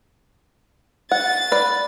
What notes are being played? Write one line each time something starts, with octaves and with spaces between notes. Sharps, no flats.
F#5 A6
B4 D5